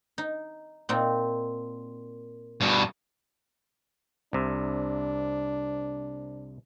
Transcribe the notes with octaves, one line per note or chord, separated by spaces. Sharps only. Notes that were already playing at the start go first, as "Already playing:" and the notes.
D#4
A#2 C4 D#4
G2 B2
C2 C3 D4